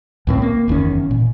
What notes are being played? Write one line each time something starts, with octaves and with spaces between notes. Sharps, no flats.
C#2 A2 A3 C4
A#3
F#1 E2 D#3 C#4
A#2